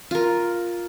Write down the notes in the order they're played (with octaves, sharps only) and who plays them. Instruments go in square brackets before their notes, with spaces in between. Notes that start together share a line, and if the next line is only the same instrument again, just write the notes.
[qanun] F4 A#4